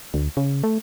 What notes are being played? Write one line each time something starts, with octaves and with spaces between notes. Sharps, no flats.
D2
C#3
A3